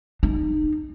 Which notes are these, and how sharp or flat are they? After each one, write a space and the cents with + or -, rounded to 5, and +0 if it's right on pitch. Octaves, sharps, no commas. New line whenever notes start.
D#4 -25